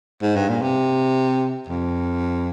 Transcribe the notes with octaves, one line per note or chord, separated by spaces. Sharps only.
G#2
G2
A#2
C3
F2